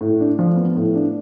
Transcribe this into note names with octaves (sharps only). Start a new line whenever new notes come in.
A2
D4
F3
B3
A2
D4